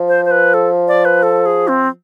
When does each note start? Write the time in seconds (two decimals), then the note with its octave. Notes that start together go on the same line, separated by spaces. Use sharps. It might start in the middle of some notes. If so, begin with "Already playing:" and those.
Already playing: F3
0.08 C5
0.25 C5
0.31 B4
0.54 A4
0.88 D5
1.05 B4
1.23 A4
1.46 G#4
1.68 C4